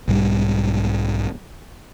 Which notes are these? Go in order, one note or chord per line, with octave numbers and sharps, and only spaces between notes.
B1 G#2 G3